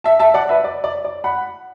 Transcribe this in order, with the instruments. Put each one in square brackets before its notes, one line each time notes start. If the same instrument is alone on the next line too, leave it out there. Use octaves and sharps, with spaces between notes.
[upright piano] E5 A5
E5 A5
D5 F#5
B4 E5
D5
D5
D5
F#5 B5